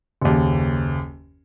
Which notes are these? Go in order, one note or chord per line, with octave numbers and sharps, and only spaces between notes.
F#1 D#2